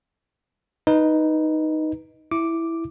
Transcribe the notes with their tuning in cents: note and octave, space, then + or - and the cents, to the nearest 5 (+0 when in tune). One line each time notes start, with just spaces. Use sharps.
D#4 +0 B4 -10
E4 +0 D6 +0